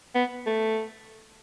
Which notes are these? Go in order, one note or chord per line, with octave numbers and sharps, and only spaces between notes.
B3
A3